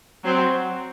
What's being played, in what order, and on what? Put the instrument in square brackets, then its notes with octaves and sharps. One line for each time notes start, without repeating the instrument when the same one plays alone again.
[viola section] F#3 C4